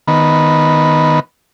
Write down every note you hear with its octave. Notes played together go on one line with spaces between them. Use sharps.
D#3 B3